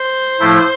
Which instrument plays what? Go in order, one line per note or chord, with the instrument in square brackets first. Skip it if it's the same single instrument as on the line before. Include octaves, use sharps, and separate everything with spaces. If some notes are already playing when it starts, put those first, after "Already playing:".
Already playing: [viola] C5
[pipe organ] A2 F3 A3 E4